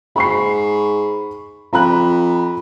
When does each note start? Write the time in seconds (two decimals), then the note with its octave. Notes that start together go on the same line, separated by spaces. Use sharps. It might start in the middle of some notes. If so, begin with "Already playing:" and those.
0.16 G#2 B5 C#6 C7
1.73 F2 A#5 B5 F#6